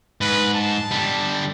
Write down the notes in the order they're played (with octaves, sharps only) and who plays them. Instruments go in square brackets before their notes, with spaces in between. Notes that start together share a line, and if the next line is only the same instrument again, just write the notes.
[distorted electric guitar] G#2 [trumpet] B4
[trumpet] A5
[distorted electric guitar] D3 G3